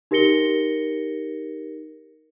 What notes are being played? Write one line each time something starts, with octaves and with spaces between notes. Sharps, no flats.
D#4 G4 A#4 A#6 C#7 G7